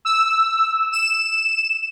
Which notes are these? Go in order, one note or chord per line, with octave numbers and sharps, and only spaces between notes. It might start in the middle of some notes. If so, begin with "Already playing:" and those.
E6
E7